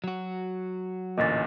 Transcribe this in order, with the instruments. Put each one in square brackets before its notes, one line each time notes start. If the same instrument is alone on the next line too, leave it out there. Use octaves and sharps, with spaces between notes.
[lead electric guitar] F#3 F#4
[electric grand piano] A1 D2 A#2 [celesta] D#5 A6